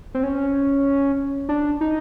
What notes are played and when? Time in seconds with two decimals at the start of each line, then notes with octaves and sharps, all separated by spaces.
0.14 C4
0.23 C#4
1.49 D4
1.81 D#4